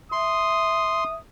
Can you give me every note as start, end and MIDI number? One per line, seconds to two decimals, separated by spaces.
0.12 1.14 76
0.12 1.04 84
0.12 1.19 87